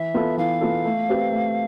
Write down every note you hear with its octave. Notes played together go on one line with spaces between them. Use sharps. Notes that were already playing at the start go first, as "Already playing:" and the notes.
Already playing: E3 E5
B3 F4 A4
E3 F5
B3 F4 A4
A3
C4 G4 B4
A3